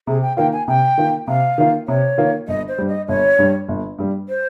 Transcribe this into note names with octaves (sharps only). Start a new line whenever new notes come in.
C3 G#4
G5
D#3 A#3 F4 G5
G#5
C3 G5
D#3 A#3 F4
C3 F5
D#3 A#3 F4
C3 C#5
D#3 A#3 F4
G1 D#5
C5
G2 G3
D#5
G1 C#5
G2 G3
G1
G2 G3
C5